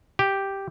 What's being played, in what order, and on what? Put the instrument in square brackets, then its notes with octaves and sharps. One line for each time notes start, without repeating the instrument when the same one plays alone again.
[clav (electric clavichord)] G4